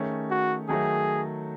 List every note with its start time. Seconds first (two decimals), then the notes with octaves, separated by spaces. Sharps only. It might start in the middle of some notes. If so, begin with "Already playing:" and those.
Already playing: D#3 A3 C#4 G#4
0.30 F#4
0.69 D#3 F#3 A3 G#4